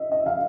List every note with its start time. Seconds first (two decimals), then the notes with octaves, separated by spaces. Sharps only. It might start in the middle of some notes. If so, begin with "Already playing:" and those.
Already playing: D#5 E5
0.12 D#5
0.26 F5